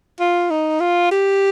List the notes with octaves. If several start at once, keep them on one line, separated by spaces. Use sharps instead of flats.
F4
D#4
F4
G4